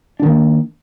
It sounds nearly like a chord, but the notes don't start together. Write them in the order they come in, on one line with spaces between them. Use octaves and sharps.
D4 D#3 A#3